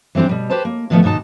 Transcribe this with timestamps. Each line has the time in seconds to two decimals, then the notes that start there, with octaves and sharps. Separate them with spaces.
0.15 E3 G3 C4 D4 G4
0.29 B2 G3
0.50 G4 B4 C5 A5
0.65 A#3
0.90 A2 D#3 F3 F#3 A3 B3
1.03 D#2 G#2 B2 D#4 A5